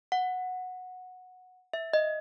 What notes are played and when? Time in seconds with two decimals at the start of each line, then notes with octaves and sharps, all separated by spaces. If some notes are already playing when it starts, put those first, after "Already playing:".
0.12 F#5
1.73 E5
1.93 D#5